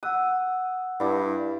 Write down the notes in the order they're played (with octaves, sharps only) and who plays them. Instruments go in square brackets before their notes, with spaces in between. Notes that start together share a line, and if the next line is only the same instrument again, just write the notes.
[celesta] F#5 E6 F#6 [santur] D#6
[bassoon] G2 [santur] E4 D5